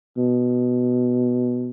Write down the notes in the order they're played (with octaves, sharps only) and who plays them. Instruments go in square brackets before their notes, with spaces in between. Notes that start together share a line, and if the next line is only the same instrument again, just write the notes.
[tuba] B2